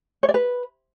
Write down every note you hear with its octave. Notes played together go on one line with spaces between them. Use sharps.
C#5
D5
B4